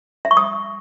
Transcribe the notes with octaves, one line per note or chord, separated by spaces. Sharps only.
E5
C#6
D#6